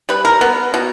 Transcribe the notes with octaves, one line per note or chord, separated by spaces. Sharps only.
G3 B4
A#4
B3
B2